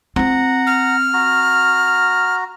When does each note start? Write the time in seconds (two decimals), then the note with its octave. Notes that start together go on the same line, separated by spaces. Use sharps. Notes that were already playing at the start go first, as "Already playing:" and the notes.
0.16 C4 F4 F#5 A#5
0.67 F6
1.13 F#4 A#5